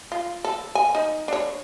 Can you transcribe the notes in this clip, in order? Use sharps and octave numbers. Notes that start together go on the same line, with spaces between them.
F4
A4
G#5
D#4
D4 C#5